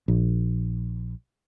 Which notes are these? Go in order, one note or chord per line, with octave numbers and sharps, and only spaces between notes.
A#1